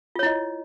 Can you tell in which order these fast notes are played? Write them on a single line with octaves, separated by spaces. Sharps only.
F4 C#5 E4 D#5